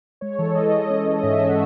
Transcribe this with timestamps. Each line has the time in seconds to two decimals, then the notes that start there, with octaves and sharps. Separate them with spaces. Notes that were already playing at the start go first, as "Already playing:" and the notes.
0.21 G#3 C#5
0.39 E3 A4
0.55 G#3 D#5
0.72 E3 D#5
0.90 C#4
1.06 C#4
1.17 D#5
1.23 G#2 E5
1.38 E5
1.49 F#5